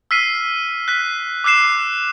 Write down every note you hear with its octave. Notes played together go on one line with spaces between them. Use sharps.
E6 F6 B6 C7 D#7
F#6 B6
D6 E6 F#6 C7 E7